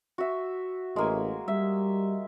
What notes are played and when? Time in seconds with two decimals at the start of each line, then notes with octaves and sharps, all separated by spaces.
0.18 F#4 E5
0.96 A1 G#3 A#3 G#5
1.48 G3 E5